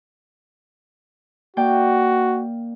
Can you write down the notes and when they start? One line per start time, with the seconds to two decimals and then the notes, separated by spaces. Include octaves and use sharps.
1.57 A#3 F#4 D5 G5